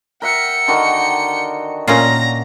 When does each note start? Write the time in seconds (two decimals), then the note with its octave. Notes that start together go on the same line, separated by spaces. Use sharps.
0.22 A#4 E5 F#5 G5 C#7
0.68 D3 D#3 F#4
1.88 A#2 C#4 F4 A#5